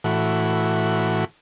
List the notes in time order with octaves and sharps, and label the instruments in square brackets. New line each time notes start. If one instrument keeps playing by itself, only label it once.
[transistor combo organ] A2 E3 F#4